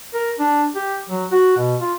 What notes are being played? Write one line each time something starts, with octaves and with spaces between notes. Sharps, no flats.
A#4
D4
G4
F#3
F#4
B2
F4